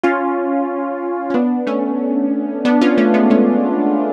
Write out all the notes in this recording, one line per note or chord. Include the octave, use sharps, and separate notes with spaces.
C#4 F4
C#4
B3 D4
A3 C#4
B3 D4
C#4 F4
A3 C#4
G#3 B3
A3 C#4